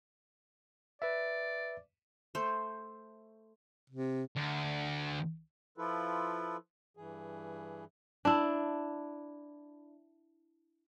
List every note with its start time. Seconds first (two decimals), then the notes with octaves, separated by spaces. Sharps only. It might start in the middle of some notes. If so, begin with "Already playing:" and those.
1.02 B4 D5 E5
2.35 A3 C5
3.90 C3
4.36 D2
5.78 F3 E4 F4 A4 B4
6.97 G2 E3 G#4
8.25 D4 E4